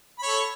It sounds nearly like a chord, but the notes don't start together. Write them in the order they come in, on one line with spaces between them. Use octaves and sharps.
B5 C#5 A4